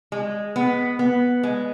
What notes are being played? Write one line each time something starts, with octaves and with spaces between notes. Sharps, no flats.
G#3
B3
B3
G#3